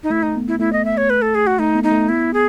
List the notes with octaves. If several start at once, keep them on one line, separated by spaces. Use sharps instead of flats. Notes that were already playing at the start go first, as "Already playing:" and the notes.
D#4
A3 E4
D#4
B3
E4
A3 E4
D#5
E5
C#5
B4
A4
G#4
F#4
A3 D#4
B3
D#4
A3
B3 E4
G#4